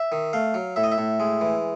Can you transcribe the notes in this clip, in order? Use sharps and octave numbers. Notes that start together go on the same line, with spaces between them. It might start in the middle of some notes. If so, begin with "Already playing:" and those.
Already playing: E5
D#3
A3 F5
F#3
A2 E5
D#5
E5
A2
G#3
E3